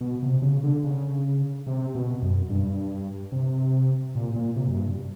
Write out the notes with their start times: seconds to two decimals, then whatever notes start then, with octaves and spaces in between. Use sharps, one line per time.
0.01 B2
0.23 C3
0.42 C#3
0.64 D3
0.84 C#3
1.67 C3
1.95 B2
2.23 F#2
2.50 G2
3.32 C3
4.15 A#2
4.36 A#2
4.56 C3
4.68 F#2
4.77 G2